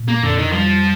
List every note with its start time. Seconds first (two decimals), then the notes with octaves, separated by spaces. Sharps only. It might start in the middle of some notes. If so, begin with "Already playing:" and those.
Already playing: A#2
0.08 A#3
0.22 F2 D3
0.38 D#3
0.53 F3 G3